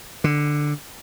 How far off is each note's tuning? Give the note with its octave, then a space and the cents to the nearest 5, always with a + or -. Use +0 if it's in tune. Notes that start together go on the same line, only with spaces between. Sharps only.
D3 +10